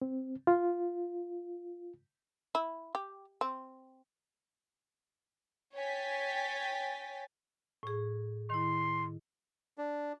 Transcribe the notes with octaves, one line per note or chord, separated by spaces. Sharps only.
C4
F4
E4
G4
C4
C#5 G5 G#5 A6 B6
A2 G#4
D#3 E4 C6
D4